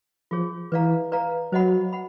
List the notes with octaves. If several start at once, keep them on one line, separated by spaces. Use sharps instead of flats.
F3 F4 G#4 C#5
E3 B4 D5 F5 A#5
B4 D5 F5 A#5
F#3 C5 D#5 F#5 B5
F#5 B5